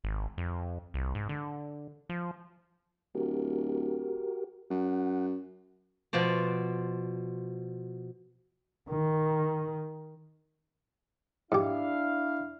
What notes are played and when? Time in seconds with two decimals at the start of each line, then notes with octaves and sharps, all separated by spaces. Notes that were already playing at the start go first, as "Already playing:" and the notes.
0.04 G#1
0.38 F2
0.94 C2
1.15 G#2
1.29 D3
2.09 F3
3.15 D1 F#4 G4 A#4
4.71 F#2 F#5
6.13 B2 F3 C5 D5
8.89 D#3
11.52 G#2 D4 E4 G4 F5